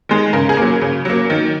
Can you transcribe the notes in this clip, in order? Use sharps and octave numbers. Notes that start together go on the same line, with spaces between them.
D#3 G#3
C#3 A#4
G#4
F#3 A#3
C#3
F#3 A#3
D#3